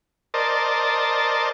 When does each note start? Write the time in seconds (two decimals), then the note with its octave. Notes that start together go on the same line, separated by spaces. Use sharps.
0.34 A#4 C5 D5 D#5 A5